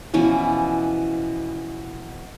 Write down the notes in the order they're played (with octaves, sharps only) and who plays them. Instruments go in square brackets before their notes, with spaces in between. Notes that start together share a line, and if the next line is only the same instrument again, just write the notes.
[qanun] B2 E3 F3 C#4